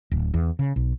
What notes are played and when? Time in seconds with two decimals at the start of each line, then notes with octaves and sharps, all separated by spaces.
0.11 D1
0.34 E2
0.59 C#3
0.76 B1